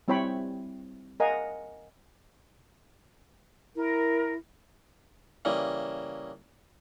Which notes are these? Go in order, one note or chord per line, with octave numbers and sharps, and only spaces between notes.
G3 C4 E4 C#5 G5 B5
A#4 D#5 F5 F#5 G#5 A#5
E4 A#4
C#3 E3 G3 A#3